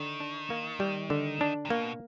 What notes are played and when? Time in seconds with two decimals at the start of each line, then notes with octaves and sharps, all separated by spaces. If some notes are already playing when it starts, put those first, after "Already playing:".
Already playing: D3 D#3
0.20 D4
0.50 A#3
0.80 G3
1.10 D3
1.41 D4
1.65 C3
1.70 B2 A#3